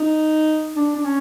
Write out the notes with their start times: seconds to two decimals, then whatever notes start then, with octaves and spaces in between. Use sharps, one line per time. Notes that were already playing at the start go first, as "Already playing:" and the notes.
Already playing: D#4
0.76 D4
0.96 D4
1.04 C#4